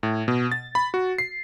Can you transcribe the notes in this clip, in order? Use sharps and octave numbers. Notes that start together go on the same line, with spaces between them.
A2
B2
A6
B5
F#4
C7